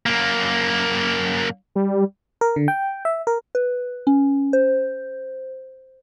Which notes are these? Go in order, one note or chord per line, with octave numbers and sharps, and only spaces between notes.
F#2 A#3
G3
A#4
D3
G5
E5
A#4
B4
C#4
C5